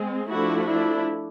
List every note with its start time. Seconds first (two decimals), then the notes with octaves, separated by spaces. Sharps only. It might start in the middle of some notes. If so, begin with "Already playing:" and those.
Already playing: G#3 C4
0.28 F3 A3 D4 E4 F#4
0.65 D4 E4